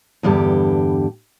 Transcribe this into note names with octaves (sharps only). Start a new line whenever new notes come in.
E2 G2 D3 G4